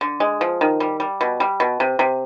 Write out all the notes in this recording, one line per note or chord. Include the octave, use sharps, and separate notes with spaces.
D3
G#3
F3
D#3
G3
G3
B2
G3
B2
C3
C3